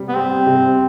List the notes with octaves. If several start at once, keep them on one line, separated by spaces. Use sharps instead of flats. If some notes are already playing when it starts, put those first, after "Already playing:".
Already playing: C3 G3
B3
G3 C4
C3